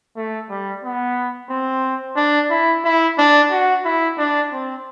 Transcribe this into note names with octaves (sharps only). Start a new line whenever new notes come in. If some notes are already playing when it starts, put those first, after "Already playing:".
A3
G3
B3
C4
D4
E4
E4
D4
F#4
E4
D4
C4